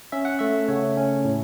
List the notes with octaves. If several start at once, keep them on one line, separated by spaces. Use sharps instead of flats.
C#4 E5
F#5
A3 E5
C#3 C#5
C#4
A2